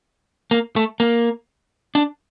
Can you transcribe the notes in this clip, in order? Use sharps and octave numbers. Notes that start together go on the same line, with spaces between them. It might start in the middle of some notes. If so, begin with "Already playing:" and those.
A#3
A3
A#3
D4